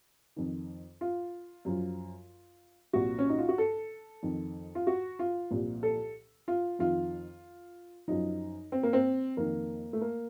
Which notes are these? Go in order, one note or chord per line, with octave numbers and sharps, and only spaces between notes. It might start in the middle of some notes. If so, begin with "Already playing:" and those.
F2 D#3
F4
F#2 F3
C2 A#2 F3 F#4
C#4
D#4
F4
F#4
A4
F2 D#3
F4
F#4
F4
C2 A#2 F3
A4
F4
F2 D#3 F4
F#2 F3 D#4
C4
A#3
C4
F2 D#3 A#3
A3
A#3